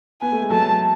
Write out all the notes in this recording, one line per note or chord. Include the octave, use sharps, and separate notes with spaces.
B3 G#5
A3
G#3
F#3 A3 A5